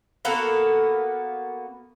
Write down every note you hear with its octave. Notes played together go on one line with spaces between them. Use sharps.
A#3 B3 F#4 A4